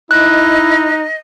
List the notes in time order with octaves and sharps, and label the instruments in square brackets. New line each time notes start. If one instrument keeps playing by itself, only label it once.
[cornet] D#4 [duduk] E4 [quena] D#5 [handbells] F#6